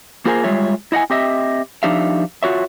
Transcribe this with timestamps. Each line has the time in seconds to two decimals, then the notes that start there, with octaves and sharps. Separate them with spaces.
0.25 A#3 F4 G#4 A#4 C5 G#5
0.44 G3 G#3 F4 C#5 E5
0.92 E4 D#5 F#5 G#5
1.10 C4 G4 D#5 E5
1.83 F3 D4 D#4 G4 E5 F5
2.43 F4 F#4 C#5 E5